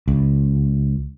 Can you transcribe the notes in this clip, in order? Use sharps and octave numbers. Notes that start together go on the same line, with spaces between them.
C#2